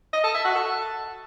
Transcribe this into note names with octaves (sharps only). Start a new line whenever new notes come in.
D#5
A4
E5
F#4
A4